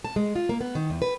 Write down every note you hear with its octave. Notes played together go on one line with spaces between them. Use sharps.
A5
G#3
F4
A#3
B3
D#3
E2
B4